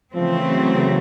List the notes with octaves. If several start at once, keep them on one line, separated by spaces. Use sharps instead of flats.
C#3 E3 F3 A3 C4
F#3